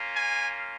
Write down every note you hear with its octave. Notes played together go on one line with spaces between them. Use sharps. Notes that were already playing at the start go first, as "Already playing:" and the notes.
Already playing: A#3 C#4 F4
G#5